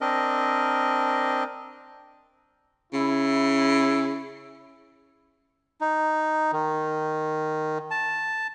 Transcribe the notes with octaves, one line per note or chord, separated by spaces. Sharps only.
C4 D4 A#4 D#5
C#3 E4
D#4
D#3
A5